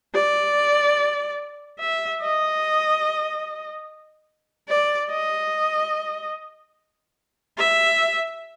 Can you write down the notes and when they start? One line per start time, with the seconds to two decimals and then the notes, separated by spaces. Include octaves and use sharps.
0.15 D5
1.80 E5
2.21 D#5
4.69 D5
5.10 D#5
7.57 E5